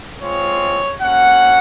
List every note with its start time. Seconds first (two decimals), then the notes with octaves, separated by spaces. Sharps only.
0.20 G#3 C4 F4 C#5
1.01 A#3 C#4 F#4 F#5